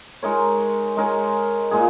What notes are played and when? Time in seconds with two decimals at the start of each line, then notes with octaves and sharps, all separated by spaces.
0.23 G#3 D#4 A#4 C#5
0.97 G#3 D#4 A#4 C#5
1.71 A#2 G#3 D#4 G#4